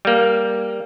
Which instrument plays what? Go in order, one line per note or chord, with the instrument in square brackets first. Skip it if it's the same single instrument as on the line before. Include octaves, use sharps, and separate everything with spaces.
[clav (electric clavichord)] G3 A#3